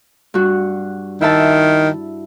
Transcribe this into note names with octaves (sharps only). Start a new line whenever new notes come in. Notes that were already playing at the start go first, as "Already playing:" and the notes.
G2 F#4
D#3 E4 E5 A5